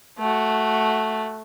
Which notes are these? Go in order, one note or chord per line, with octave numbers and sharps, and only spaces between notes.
A3 F#4